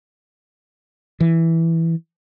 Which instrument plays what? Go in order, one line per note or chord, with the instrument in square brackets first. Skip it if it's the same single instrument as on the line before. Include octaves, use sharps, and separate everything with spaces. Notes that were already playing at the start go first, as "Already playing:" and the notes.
[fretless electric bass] E3